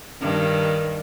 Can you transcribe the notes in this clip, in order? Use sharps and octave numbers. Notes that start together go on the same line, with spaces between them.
G2 D#3